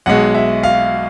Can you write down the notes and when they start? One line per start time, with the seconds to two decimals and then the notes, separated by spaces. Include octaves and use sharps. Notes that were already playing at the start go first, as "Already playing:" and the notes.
0.06 B1 B2 G#3 F#5
0.35 E5
0.63 F5